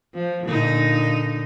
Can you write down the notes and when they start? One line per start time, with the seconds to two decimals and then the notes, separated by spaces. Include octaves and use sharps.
0.15 F3
0.45 A#2 D3 D#4